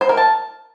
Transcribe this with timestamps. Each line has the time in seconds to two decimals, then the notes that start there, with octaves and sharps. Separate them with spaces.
0.01 C5
0.09 A#4
0.17 A5